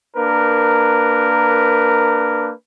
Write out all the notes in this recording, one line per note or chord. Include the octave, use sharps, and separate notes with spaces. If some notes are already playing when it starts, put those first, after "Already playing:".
A#3 D4 A#4 B4